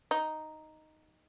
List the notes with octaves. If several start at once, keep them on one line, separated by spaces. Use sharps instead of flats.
D#4